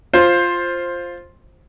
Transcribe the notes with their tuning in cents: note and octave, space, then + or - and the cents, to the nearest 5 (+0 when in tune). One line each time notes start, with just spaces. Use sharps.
F4 +0 C5 +10